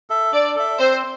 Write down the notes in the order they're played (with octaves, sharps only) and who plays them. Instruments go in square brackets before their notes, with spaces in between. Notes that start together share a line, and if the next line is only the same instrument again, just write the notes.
[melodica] A4 E5
[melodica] D4 [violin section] D5
[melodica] A4 E5
[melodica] C4 [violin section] C5